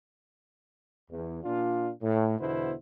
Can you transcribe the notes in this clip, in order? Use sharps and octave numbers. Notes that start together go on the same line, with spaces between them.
E2
A#2 D4 F4
A2
E2 B2 D3 B3 E4 C5